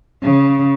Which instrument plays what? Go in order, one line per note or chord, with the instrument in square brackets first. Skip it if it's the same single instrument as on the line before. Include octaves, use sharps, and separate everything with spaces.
[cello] C#3